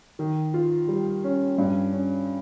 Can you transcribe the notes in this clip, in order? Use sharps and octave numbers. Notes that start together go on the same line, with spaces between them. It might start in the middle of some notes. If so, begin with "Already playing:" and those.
D#3
F4
G3
C#4
G2
C#4